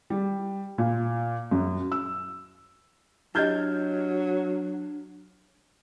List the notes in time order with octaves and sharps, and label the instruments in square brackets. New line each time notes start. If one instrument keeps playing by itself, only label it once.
[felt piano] G3
A#2
F#2
E6
[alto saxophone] F#3 [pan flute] D4 [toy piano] E4 G4 D#5 [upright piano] F6 G6 G#6